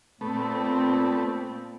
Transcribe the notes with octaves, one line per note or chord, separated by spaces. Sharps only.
A#2 A3 B3 C4